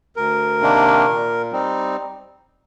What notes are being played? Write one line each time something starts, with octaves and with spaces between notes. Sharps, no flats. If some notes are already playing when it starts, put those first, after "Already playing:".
D2 A#4
C3 D#3 A#3 D4
A#2
G3 C4 D#4